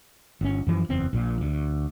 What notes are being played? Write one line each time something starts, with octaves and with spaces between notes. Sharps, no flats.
G1 C#4
F#2 E3 F3
F#1 E2 C4
A#1 A#2
D2